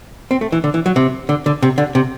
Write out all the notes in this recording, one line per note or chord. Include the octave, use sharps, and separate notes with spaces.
C4
A3
E3
D3
E3
F#3
C3
D3
D3
C3
D3
C3